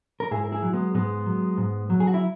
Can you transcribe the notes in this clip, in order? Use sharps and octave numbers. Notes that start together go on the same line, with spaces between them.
A#4
G#2 E4 G#4
A#4
E4 G#4
F#3
G#3 B3
G#2 G#3 B3
F#3
G#2
F#3
G#4
F#4
E4